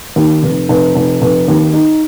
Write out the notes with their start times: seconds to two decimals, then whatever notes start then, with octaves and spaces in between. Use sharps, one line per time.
0.16 D#2
0.43 F1
0.69 F1
0.95 F1
1.22 F1
1.48 D#2
1.73 D#4